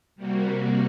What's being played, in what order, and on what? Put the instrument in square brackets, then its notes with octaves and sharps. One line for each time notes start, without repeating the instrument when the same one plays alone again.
[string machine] C3 G3 A#3 F#4